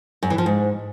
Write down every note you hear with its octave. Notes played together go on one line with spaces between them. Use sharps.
F#2
E3
F3
G#2